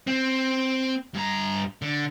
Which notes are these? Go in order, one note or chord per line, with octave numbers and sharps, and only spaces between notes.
C4
G2 A#5
D3